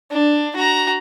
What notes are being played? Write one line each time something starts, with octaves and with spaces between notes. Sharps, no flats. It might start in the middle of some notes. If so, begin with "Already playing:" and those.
D4
F#4 A#5